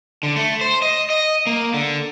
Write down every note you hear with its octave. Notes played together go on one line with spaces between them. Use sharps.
D3
A3
C5
D#5
D#5
A#3
D3